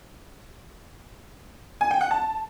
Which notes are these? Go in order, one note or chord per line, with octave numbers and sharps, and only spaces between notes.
G#5
G5
F#5
A5